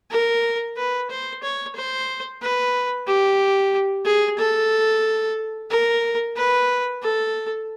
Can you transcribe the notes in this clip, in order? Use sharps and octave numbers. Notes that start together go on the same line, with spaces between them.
A#4
B4
C5
C#5
C5
B4
G4
G#4
A4
A#4
B4
A4